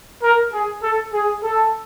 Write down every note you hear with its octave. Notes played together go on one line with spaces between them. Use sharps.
A#4
G#4
A4
G#4
A4